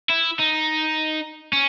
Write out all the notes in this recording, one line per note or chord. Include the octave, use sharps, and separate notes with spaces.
E4
D#4
C#4